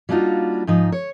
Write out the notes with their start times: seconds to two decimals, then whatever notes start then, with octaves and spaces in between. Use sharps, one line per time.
0.09 G3 A#3 D4 D#4 F4 F#4
0.67 G#2 F3 D#4
0.92 C#5